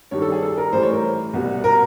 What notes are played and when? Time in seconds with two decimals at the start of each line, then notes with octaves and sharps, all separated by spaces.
0.11 G2 D#3 G3 C#5
0.22 A4
0.32 G#4
0.42 A4
0.57 A#4
0.73 A2 E3 G3 C5
0.83 C#5
0.93 A#4
1.34 C2 B2 G3
1.64 A#4